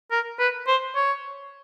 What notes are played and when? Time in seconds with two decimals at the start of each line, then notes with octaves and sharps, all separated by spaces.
0.11 A#4
0.39 B4
0.67 C5
0.96 C#5